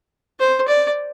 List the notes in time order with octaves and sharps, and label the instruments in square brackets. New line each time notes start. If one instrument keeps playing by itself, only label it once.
[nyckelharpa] C5
D5